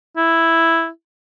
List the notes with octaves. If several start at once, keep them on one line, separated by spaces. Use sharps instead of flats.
E4